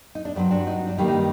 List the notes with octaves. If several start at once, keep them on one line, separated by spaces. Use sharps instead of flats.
D#4
D4
G2 F#3 C4 D4
D4 F#4
D#4
D4
G2 D#3 G3 A#3 D#4
D#4